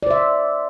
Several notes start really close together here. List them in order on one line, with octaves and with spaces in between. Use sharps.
D5 C5 E5